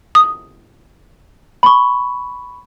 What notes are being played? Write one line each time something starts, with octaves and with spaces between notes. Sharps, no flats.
D#6
B5 C#6